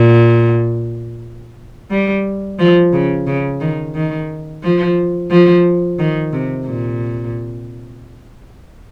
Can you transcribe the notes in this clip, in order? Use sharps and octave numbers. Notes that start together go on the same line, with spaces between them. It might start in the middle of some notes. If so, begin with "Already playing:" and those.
Already playing: A#2
G3
F3
C#3
C#3
D#3
D#3
F3
F3
D#3
C3
A#2